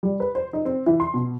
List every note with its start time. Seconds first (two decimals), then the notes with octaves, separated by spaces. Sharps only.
0.03 G3
0.20 B4
0.35 C5
0.53 D#4
0.65 C4
0.86 E3
1.00 C6
1.14 B2